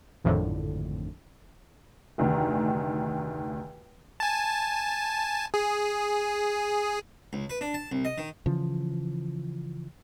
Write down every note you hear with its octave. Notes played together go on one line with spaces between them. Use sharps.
G#1 F2 A2 D3
F1 D2 D#3
G#5 A5
G#4
C#2
B4
D4
A5
C2
D#5
D#3
C#3 E3 F3